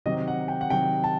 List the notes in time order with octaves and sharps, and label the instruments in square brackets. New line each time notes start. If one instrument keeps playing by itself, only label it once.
[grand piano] C3 D#3 F#3 D#5
F#5
G5
F#5
C3 D#3 F#3 G5
A5